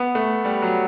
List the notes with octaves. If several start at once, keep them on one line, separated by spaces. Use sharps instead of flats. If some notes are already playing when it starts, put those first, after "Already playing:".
Already playing: B3
A3
G3
F#3